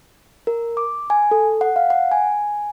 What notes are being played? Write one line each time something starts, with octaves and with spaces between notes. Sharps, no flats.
A#4
D6
G#5
A4
F#5
F5
F#5
G#5